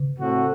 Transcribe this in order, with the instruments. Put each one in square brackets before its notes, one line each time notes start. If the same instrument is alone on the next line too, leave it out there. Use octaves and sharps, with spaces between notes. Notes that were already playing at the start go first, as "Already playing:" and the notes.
Already playing: [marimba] C#3
[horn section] A2 A3 C4 F#4